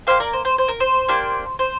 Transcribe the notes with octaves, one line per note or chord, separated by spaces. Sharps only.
A#3 G4 C5 F5
A#4 D5
C5
C5
C5
A#4
C5
A#3 D4 G4
C5